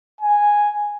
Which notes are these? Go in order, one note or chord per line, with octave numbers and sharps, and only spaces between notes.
G#5